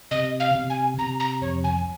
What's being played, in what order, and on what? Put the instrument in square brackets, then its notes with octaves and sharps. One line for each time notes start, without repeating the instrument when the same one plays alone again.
[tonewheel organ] C3 [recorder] D#5
[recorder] F5
[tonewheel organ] C3
[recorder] G#5
[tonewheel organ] C3 [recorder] A#5
[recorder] A#5
[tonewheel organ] F2 [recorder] C#5
[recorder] G#5